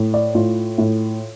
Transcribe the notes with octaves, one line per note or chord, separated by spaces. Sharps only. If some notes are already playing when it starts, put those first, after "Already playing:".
Already playing: A2
D5
A2 F4
A2